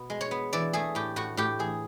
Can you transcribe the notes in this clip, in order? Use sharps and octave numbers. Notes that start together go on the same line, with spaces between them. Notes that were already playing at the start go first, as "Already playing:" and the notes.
Already playing: B2 B3
G#3
C#5
B3
E3 D5
A3 G#4
A2 G4
A2 F#4
A2 G4
E3 G#4